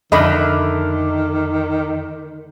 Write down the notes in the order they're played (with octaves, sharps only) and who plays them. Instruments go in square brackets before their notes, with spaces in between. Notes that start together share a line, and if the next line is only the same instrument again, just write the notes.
[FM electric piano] F2 D6 F6 [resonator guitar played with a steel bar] D3 A3 [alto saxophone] D#3 [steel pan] D#5 B5